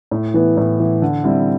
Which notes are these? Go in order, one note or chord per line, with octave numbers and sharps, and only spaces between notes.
A2
E3 B3 E4
A2
E3 B3 E4
D3
G3 C4 E4